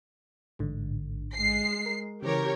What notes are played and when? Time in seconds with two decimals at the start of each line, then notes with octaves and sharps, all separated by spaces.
0.59 A1 G#2 D3
1.35 G#3 C7
1.86 A#4
2.22 C#3 E3 G4 A#4 C#5